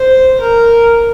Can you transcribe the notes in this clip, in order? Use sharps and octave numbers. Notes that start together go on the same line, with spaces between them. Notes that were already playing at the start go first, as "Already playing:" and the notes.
Already playing: C5
A#4